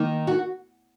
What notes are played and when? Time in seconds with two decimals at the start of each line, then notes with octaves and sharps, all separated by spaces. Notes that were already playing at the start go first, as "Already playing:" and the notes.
Already playing: D#3 A#3 D#4
0.27 F#4